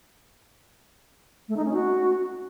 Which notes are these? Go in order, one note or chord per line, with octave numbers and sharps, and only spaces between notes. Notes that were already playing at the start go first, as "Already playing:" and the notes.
A3
D#4
C#4
F#4